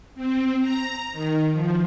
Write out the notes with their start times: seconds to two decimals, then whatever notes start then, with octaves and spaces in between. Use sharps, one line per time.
0.15 C4
0.60 A#5
1.12 D#3
1.52 F3